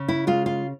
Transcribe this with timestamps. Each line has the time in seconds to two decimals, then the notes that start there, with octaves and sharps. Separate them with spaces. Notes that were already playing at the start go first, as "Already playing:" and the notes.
Already playing: C#3
0.08 E4
0.27 G#3 F4
0.46 F4